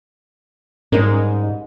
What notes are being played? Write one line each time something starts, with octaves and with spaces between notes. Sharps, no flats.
G#2 G3 C#4 D#4 A#4